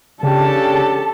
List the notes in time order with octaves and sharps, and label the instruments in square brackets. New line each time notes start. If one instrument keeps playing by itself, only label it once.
[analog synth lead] C#3 [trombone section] C#4 D4 G4 [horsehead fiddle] A4 A5